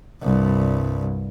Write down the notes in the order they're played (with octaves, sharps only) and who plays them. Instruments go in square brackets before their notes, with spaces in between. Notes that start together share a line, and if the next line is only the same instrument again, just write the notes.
[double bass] C2 G2